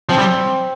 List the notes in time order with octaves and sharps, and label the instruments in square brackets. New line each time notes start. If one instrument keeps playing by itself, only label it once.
[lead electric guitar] F3 [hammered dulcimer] C4
[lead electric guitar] G3